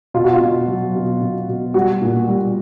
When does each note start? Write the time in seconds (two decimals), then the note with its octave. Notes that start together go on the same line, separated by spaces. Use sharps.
0.14 B2 F4
0.24 F#4
0.33 F4
0.41 B2
0.68 F#3
0.95 B2
1.21 B2
1.48 B2
1.74 G3 F#4
2.02 A#2
2.28 G3